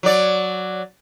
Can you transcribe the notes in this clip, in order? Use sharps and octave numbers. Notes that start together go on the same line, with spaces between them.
F#3 D5